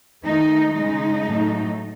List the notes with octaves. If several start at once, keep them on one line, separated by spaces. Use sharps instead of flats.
D#3 A3 D#4
C#3 G#3 D#4
A2 F#3 A3